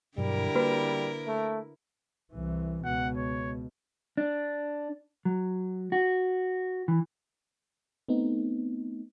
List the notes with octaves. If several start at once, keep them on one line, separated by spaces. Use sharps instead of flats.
G2 B2 D3 F#3 G3 E4 A#4
A#3 F#4 B4 B5
A3
C2 E3
C#2 B2 F#5
C#5
D4
F#3
F#4
E3
A3 B3 C4 D#4